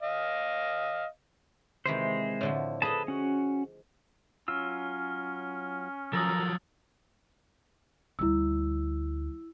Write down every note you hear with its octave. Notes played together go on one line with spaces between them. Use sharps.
D#5 F5
C3 D#3 E3 G#3 C5
A2 D3 F3
G#4 A4 B4 D#5 A5
C#4 F#4
F#3 C#4 F4 E6 F6
F3 F#3 A4 A#4 A#5 D#6 E6 A6
D2 G3 E4 E6